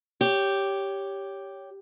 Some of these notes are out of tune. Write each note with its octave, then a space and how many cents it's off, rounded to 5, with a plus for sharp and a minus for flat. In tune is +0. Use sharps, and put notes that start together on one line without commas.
G4 +0 C#5 +10